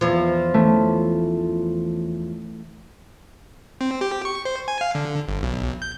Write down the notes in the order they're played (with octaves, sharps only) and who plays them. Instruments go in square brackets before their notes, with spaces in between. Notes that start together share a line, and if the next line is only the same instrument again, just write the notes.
[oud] E2 F3
[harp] E3 A3 C#4
[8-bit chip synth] C4
G4
C#6
C5
G#5
F5
D3
G1
B1
G6